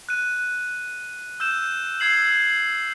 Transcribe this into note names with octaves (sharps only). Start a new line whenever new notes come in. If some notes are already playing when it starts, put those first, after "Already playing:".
F#6 D#7
E6 G6 E7
E6 G#6 C7 F#7